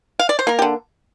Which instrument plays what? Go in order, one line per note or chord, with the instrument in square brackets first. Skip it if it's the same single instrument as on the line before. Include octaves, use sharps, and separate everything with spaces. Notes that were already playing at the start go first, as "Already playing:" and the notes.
[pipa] F5
D5
C5
A#3 A#4
G4
D3